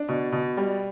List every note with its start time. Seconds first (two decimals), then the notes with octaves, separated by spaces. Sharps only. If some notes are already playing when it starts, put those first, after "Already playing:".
Already playing: D4
0.09 B2
0.32 B2
0.57 G3